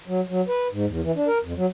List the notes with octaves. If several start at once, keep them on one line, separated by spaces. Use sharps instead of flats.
F#3
F#3
B4
G#2
E2
E3
D4
A#4
F2
F#3